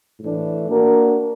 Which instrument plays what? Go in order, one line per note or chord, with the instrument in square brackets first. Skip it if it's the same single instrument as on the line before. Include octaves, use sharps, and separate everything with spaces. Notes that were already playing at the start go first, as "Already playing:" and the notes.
[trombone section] A2 E3 A3 D4
A#3 D4 F#4 A#4